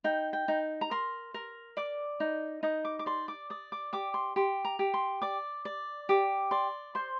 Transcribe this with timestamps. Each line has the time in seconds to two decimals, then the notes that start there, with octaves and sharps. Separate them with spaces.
0.04 D#4 G5
0.33 G5
0.48 D#4
0.81 A#5
0.91 A#4 C6
1.34 A#4
1.77 D5 D6
2.20 D#4
2.63 D#4 D#6
2.85 D6
2.99 D6
3.06 D5 C6
3.28 D6
3.50 D5 D#6
3.72 D6
3.93 G4 D6
4.14 C6
4.36 G4 C6
4.65 A#5
4.79 G4
4.94 C6
5.22 D5 D6
5.65 D5
6.09 G4 D6
6.51 D5 C6
6.95 C5 C6